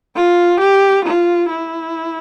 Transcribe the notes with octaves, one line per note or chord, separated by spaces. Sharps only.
F4
G4
F4
E4